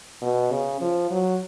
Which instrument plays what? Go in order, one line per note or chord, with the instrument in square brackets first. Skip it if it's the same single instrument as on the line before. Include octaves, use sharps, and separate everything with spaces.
[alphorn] B2
C#3
F3
F#3